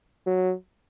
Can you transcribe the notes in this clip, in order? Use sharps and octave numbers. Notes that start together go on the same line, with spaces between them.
F#3